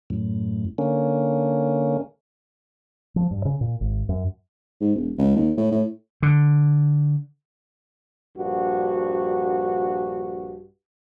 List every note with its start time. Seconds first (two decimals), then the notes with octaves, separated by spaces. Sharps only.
0.10 F#2 A2
0.78 D3 A#3 C#4
3.16 F3
3.31 G2
3.45 C#3
3.61 A#2
3.81 G#1
4.09 F#2
4.81 G#2
4.95 E1
5.18 C#2
5.36 D#2
5.57 A2
5.71 A2
6.23 D3
8.38 A#1 G2 F#4